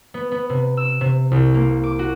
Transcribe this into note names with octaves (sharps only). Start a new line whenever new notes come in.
B3
B3
C3
E6
C3
C2
A#3
D6
F#4